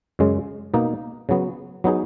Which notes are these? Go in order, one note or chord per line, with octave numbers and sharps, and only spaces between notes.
F#2 C#3 G#3
B2 A#3 D#4
C#3 F#3 B3
F#3 B3 D#4 G#4